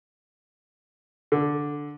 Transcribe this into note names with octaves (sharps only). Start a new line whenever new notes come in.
D3